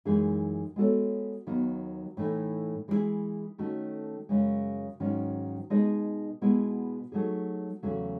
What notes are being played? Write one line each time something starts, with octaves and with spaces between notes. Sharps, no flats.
F#2 E3 G#3 D#4 G#4
G#3 B3 F#4 A4 C#5
D#2 D#3 F#3 B3
A2 E3 A3 D#4
E3 G#3 B3 E4 G#4
D#3 A3 C#4 F#4 A4
F#2 C#3 G#3
G#2 D#3 F#3 C#4
B2 G#3 D#4 G#4 D#5
B2 G#3 B3 E4 G#4
F#3 A3 D#4 G#4
E2 C#3 F#3 A3